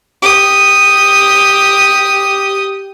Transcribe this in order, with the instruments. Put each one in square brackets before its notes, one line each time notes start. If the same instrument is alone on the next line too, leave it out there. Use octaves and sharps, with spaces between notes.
[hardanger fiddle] G4 D#6